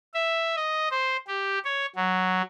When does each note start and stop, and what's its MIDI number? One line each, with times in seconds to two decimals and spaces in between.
0.14 0.56 76
0.56 0.88 75
0.91 1.17 72
1.27 1.59 67
1.65 1.86 73
1.96 2.42 54